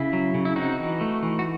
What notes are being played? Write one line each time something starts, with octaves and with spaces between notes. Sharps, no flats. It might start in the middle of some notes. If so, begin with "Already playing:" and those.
Already playing: C#3 E4
F#3
C#3
E4
C4 D#4 F#4
E3
A3
E3
F#4